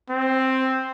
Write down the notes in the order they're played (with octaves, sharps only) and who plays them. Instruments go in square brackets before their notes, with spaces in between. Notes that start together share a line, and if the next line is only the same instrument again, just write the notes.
[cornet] C4